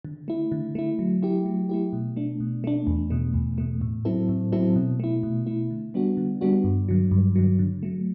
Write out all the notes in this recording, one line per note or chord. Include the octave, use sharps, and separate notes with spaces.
D3
A3 E4
D3
A3 E4
F#3
A3 E4 G4
F#3
A3 E4 G4
B2
A3 D4
B2
A3 D4
E2
B2 A3
E2
B2 A3
A2
F#3 C4 E4 A4
A2
F#3 C4 E4 A4
B2
A3 E4
B2
A3 E4
D3
G3 B3 D4 F#4
D3
G3 B3 D4 F#4
G2
D3 F#3
G2
D3 F#3
D3
F#3 A3